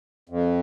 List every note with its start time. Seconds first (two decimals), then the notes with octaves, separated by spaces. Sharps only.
0.29 F2